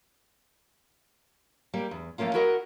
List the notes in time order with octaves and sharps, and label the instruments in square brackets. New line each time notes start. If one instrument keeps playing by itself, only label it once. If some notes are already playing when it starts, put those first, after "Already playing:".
[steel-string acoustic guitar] G3 A#3
E2
F3 A3 A#3 C#4 F4
E4 F#4 A#4 D#5 F#5